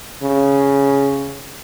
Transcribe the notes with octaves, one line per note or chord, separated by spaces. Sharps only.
C#3